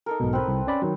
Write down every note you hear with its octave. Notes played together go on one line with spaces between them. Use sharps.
D#4 A4 A#4
B1 G#2 B2
C4 B4
C2
C#4 D5 B5
D#3 F#3